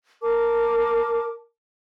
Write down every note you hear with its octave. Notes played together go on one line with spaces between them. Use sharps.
A#4 A5 D6